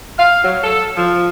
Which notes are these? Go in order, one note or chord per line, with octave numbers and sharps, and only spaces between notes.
F5
F#3
A4
F3